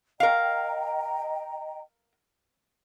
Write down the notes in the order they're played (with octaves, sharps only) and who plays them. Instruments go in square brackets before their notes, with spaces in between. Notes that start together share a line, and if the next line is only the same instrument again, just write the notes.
[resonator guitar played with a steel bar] A#4 F5 [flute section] D#5 G5 A#5